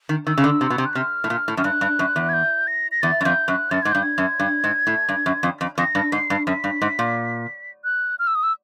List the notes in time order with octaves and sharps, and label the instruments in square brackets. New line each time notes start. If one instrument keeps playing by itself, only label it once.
[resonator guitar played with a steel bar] D#3
[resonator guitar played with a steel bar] D#3 [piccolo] E6
[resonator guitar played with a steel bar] C#3
D3
C3
B2
C3
[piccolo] F#6
[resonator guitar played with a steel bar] C3 [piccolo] F6
[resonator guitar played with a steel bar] A2
A#2
A2
[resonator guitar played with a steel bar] F#2 [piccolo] F6
[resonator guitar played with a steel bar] G2 [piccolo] F#6
[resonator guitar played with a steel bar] G2
F#2
E2
[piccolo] G#6
G6
A#6
A#6
[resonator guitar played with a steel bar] E2 [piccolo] A6
[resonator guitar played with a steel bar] F#2
[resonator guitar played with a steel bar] F2 [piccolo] G6
[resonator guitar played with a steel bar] F#2 [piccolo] F#6
[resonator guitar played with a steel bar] F#2 [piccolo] A6
[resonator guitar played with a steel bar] G#2 [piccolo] G#6
[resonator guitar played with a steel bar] G2 [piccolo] G6
[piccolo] G#6
[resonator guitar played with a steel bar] F#2
G2
G#2
A2
G2
F#2
F2
F2
[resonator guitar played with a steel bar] F2 [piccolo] A#6
[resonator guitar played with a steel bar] G2
[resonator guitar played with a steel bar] G#2 [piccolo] C7
[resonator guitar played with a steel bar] G2
[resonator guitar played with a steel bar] F#2 [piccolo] B6
[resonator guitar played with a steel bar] G2
G#2
A#2
[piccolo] F#6
F6
E6
D#6
E6